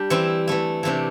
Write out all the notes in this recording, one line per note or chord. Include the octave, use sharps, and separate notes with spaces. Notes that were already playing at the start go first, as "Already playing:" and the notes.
Already playing: G3 D4
E3 C4 E4
E3 A3 E4
C3 E3 A3 D4